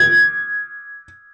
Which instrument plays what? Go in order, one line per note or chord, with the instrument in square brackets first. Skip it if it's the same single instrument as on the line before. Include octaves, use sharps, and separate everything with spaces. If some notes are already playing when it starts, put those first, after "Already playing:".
Already playing: [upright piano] G#6